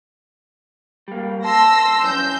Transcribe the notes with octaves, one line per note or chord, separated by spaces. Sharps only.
G3 A#3
A5 C6 E6 A#6
F#2 E3 C#4 G6